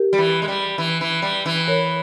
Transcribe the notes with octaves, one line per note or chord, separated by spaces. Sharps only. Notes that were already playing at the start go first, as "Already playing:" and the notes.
Already playing: G4 A#4
G3
E3
G#3
G3
E3
E3
G3
E3
A#4 C#5